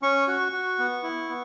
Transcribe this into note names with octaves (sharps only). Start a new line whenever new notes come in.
C#4 C#6
F#4
F#4
B3
E4
B3